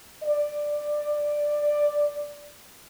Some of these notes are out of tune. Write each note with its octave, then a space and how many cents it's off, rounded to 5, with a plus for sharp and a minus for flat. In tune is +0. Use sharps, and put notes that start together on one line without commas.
D5 +10